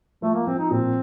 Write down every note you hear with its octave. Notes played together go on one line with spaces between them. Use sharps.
F3 A3
A#3
F3 C4
D#4
A#2 C4